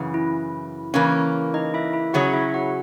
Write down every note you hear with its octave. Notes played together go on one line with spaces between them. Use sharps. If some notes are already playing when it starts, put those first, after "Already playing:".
Already playing: F#2 C#3 E3
E4
C#3 E3 A#3 C#4
D#4 D#5
E4 E5
E4 E5
C#3 F#3 C#4 F#4 G#4 C#5 F#5
E4 E5
F#4 F#5